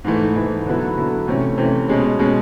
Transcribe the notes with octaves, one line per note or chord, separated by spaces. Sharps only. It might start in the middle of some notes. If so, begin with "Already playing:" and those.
G#2 E3 A3
G#2 E3 A3
D3 F#3 B3 E4
D3 F#3 B3 E4
C3 E3 A3 C#4
C3 E3 A3 C#4
B2 G#3 C#4
B2 G#3 C#4